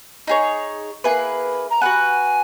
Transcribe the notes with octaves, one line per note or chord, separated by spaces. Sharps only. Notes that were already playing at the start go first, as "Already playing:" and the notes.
D#4 G#4 C#5
A#3 E4 G#4 B4
A#5
F#4 B4 F#5 G#5